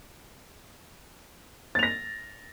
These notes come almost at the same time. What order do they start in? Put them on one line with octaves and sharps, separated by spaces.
A6 F7 A#6